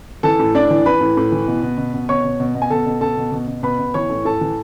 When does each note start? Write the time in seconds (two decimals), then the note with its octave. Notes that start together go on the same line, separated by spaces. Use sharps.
0.23 E3 A4 A5
0.39 A2
0.54 A2 D4 D5
0.70 E3
0.86 E3 B4 B5
1.01 A2
1.17 A2
1.32 E3
1.48 B2
1.63 B2
1.78 B2
1.94 B2
2.09 B2 C#5 C#6
2.24 B2
2.40 B2
2.55 B2
2.62 G#5
2.70 B2 A4 A5
2.86 B2
3.01 B2 A4 A5
3.17 B2
3.32 B2
3.48 B2
3.63 B2 B4 B5
3.79 B2
3.94 E3 C#5 C#6
4.10 A2
4.25 A2 A4 A5
4.41 E3